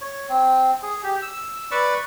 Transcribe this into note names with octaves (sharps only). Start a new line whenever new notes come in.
C#5
C4
G#4
G4
E6
B4 D5 B5 C#6